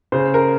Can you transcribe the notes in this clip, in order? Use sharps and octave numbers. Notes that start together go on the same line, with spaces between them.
C#3 C5
A#4